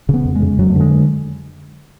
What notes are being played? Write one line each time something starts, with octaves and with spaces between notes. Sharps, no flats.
C#3 B3
F2
G#3
C#3
F2 F#3
A3
D3
G#3